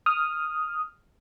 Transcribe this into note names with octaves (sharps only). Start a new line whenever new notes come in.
D#6 F6